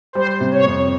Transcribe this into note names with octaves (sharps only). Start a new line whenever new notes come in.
G3 C5
C3
C#5
F2